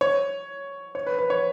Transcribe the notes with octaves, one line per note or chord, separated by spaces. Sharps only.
C#5
C#5
B4
B4
C#5